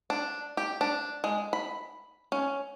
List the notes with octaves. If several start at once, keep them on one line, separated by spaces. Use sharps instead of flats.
D4
G4
D4
G#3
B5
C#4